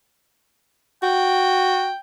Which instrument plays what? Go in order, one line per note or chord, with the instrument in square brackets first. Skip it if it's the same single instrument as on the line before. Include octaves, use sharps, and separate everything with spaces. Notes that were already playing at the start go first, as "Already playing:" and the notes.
[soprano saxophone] F#4 [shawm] G5